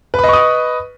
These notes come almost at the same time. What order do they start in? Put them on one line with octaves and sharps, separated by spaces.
B4 B5 D#5 C#6 D#6